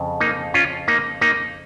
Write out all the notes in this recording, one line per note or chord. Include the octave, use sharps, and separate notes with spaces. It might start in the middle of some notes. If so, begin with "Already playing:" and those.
Already playing: F2 C#3
A#3 D#4
C#4 F4
A#3 D#4
A#3 D#4